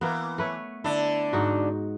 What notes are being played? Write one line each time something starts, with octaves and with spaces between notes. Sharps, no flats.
E3 A#3 B3
A3 B4 C#5
D3 D4 E4
G#2 D#4 F#4